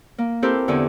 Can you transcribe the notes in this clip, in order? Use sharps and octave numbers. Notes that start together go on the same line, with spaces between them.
A#3
C4 E4 G4 A4 A#4 C5
E2 D3 A4 G#5